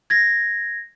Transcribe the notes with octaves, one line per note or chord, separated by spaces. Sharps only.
G#6 A#6